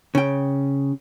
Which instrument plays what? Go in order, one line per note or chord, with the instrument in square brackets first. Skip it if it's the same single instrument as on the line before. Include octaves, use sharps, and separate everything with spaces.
[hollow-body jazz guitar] C#3 G5